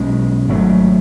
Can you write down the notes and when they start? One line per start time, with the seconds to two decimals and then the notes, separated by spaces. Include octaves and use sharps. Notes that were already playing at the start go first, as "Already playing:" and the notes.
Already playing: B1 B2 G#3 C#4
0.48 G#1 G#2 F#3 A3